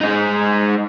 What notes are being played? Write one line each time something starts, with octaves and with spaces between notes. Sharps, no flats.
G#3 D#4